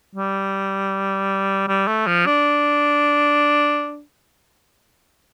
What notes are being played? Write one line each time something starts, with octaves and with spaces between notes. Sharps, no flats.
G3
G3
A3
F3
D4